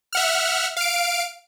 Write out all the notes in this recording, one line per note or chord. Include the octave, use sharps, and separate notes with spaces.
E5 F#5 F6
F5 D7